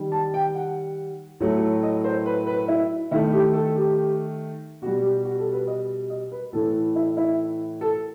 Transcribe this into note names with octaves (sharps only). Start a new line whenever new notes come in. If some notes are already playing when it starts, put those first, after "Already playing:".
Already playing: D#3 G3
A5
G5
F#5
A2 F#3 A3
D#5
C5
B4
B4
E4
D#3 A3 E4
G4
A4
G4
B2 G3 F#4
G4
F#4
A4
B4
D#5
D#5
B4
A2 E3 A3 A4
E4
E4
A4